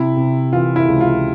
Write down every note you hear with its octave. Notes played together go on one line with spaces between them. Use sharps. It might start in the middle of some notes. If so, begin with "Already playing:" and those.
Already playing: C3 E4
C3
E3 F4
E4
C#2
F4